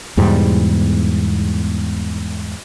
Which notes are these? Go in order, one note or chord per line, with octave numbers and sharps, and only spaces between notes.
E2 G#2 B2 G3